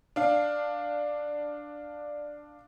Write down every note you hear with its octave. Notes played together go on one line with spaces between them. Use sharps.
D4 F5